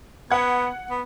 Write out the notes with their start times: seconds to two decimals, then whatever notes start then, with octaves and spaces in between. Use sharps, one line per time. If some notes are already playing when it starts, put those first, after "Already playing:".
0.31 B3 F#5 G#6
0.90 B3